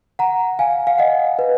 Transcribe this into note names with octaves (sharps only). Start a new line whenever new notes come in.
F#5 A#5
F5 G#5
F5
D#5 F#5
B4